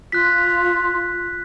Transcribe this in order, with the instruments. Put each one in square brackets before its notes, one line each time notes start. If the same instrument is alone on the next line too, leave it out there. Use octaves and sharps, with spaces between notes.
[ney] F4 [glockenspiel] F#6 B6